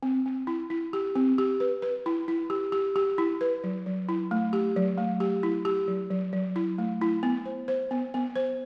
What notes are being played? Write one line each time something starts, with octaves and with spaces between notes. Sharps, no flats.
C4
C4
E4
E4
G4
C4
G4
B4
B4
E4
E4
G4
G4
G4
E4
B4
F#3
F#3
E4
A3
G4
F#3
A3
G4
E4
G4
F#3
F#3
F#3
E4
A3
E4
B3
C5
C5
B3
B3
C5